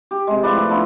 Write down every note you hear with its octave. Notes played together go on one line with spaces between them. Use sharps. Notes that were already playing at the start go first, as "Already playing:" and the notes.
G4
C3 G#3
A2 F3 B4 D5
A2
F3 B3 D4 E4